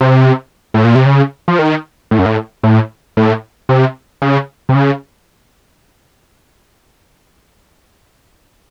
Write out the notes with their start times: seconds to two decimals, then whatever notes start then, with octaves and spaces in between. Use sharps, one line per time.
0.01 C3
0.74 A2
0.84 A#2
0.95 C3
1.06 C#3
1.48 F3
1.59 D#3
2.11 A2
2.19 F#2
2.26 A2
2.63 A2
3.17 A2
3.69 C3
4.22 C#3
4.69 C3
4.75 C#3